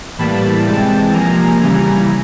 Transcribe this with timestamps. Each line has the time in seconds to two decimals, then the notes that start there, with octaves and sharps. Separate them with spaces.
0.18 A2 E3 G3 A#3 A5 B5
0.66 C3 E3 G#3 G5 A5
1.14 C3 F3 A#3 G#5 A#5
1.62 C#3 E3 G3